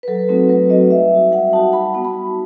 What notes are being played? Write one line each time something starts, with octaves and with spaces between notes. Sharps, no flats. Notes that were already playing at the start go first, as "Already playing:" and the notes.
B4
F#3 A4
A3 C4 D#4 F#4 A4
F#3 B4
A3 C4 D#4 F#4 D#5
G3 E5
D#4 F#4
G3 F#5
D#4 F#4 A5
G3 B5
B3 D#4 F#4 A5
B5
G3